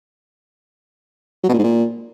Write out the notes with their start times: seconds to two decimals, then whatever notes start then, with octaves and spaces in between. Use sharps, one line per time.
1.44 F#3
1.49 B2
1.54 A#2
1.59 G#2
1.64 A#2